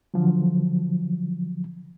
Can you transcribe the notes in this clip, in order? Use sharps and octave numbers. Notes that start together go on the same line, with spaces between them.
D3 F3 F#3